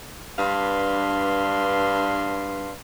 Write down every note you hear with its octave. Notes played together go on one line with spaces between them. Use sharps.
G2 D4 B4 F5 C6